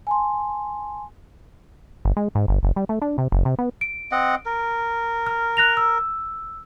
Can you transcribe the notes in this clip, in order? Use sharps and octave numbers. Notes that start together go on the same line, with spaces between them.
G#5 A5 C6
G1
G#3
G#2
G1
F#1
G3
A3
D4
C3
F#1
C3
B3
D7
C4 D#5 F#5
A#4
F6
F#6 A#6 F7
E6